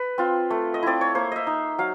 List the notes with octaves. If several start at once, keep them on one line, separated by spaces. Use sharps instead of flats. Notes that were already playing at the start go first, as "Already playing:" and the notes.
Already playing: B4
C4 F4
A3
D#5
C4 E4 D5
C#5
A#3 C5
D#5 E5
D#4
F#3 F5